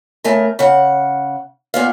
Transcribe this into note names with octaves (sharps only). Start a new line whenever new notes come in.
C#3 A3 A#4
C#3 F#5
A#2 B3 F5